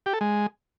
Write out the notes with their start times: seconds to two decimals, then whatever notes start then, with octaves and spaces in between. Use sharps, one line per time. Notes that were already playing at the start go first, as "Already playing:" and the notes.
0.06 G4
0.13 A4
0.21 G#3